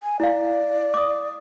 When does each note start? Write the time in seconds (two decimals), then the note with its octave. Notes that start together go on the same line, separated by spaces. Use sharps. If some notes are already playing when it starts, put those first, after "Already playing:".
0.03 G#5
0.20 E4 D5 F5
0.94 D6 D#6